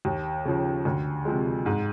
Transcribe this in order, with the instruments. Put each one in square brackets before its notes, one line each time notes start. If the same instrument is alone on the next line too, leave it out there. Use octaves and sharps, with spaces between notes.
[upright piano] D#2
C#3 F3
D2
C3 F3 G#3
G#2